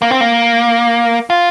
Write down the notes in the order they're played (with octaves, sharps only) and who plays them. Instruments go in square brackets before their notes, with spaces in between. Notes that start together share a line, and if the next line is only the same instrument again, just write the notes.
[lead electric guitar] A#3
C4
A#3
F4